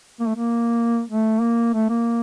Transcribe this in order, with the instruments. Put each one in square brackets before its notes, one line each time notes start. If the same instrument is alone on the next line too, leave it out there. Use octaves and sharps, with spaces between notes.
[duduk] A#3
A3
A#3
A3
A#3
A3
A#3